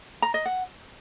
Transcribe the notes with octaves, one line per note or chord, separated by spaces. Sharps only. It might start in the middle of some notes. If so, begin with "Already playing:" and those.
A#5
D#5
F#5